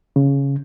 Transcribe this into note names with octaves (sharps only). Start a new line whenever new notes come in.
C#3